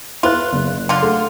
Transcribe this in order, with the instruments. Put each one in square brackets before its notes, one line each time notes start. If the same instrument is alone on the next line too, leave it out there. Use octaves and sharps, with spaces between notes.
[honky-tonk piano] E4 B4 F#6 [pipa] F4
[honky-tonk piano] F#1
[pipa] D3 F4
[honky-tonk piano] A3